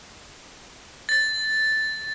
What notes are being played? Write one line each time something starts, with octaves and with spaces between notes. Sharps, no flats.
A6